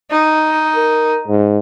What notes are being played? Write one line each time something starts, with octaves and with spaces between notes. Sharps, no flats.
D#4
A#4
G#2